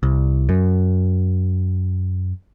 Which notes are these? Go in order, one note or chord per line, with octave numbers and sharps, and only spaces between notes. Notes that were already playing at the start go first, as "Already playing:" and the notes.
C2
F#2